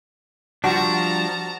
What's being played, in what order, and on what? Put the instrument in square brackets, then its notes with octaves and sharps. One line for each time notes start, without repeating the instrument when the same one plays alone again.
[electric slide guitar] F3 G3 D4 [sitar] F#4 [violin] A5 A#5